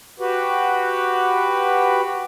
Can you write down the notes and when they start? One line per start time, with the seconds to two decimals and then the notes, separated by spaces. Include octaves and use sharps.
0.20 F#4 G4 B4